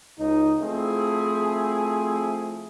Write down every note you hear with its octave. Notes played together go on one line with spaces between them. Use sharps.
C#2 D#4
F3 A3 C4 E4 G#4